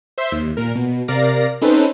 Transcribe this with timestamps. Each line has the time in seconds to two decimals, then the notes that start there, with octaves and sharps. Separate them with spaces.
0.18 C5 E5 C6
0.32 D#2
0.57 A#2 A#4
0.75 B2
1.08 C3 A#4 D5 F5 A#6
1.61 C4 C#4 D#4 A4 B4 C5